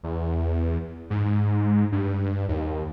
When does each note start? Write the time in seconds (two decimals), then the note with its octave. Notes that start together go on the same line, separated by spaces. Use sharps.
0.03 E2
1.10 G#2
1.92 G2
2.48 D#2